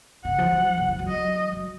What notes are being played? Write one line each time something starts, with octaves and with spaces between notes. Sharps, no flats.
C#3 F#5
F3
F#3
F3
C#3
F3
F#3
D#5
F#3